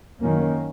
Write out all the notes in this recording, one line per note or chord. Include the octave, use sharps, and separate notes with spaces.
F#2 D#3 A#3 C#4